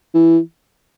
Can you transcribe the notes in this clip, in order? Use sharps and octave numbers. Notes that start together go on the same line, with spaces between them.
E3